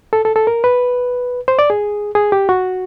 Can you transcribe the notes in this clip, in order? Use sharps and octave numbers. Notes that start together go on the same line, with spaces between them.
A4
A4
A4
A#4
B4
C5
D5
G#4
G#4
G4
F#4